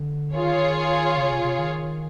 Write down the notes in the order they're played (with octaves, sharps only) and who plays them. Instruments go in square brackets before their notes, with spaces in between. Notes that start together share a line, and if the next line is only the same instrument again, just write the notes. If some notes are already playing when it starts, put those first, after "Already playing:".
Already playing: [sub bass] D3
[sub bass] D#3 [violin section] F4 G#4 C#5
[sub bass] C#3
C3
C3
D#3